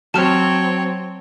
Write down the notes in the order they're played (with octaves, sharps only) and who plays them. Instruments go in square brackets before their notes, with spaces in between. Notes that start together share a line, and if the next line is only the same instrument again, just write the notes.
[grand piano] F#3 [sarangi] C4 [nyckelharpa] C#5 [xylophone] A5 F6